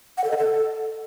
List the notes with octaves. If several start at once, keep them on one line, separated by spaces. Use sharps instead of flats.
F#5
A4
D#5
A4